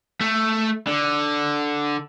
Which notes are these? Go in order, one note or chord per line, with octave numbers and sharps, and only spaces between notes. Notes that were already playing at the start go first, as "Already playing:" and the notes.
A3
D3